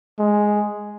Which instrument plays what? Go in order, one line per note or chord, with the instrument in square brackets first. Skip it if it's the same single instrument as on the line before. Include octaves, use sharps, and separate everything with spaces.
[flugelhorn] G#3